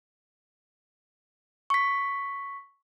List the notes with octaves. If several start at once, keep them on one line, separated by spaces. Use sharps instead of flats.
C#6 B6